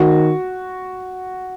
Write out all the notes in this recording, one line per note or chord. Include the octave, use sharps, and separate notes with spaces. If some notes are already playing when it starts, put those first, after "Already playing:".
Already playing: D#3 F#4